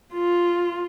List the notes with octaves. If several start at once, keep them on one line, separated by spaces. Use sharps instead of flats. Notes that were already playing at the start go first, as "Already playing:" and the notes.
F4